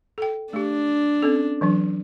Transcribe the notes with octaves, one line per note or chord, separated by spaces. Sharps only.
A4 G5
A3 D4 G4
C4 C#4 A4
E3 F#3 D4